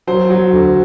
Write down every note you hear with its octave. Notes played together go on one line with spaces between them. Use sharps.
F#3 C5
F#3
D2